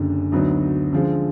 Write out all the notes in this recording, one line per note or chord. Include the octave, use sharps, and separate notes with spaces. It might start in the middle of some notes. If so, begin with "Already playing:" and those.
Already playing: F#1 F#2 D3
D2 D3 F#3 B3 D#4
F#2 D3 F3 G#3